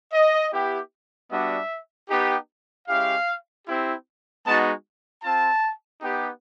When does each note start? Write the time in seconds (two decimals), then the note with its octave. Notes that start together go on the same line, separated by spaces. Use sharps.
0.12 D#5
0.51 B3 E4 G4
1.30 G3 B3 D4 F#4 E5
2.09 B3 D#4 G4
2.87 G#3 C#4 E4 G4 F5
3.66 C4 E4 G4
4.44 G#3 B3 D#4 F#4 A5
5.23 C4 F4 A5
6.01 B3 D#4 G4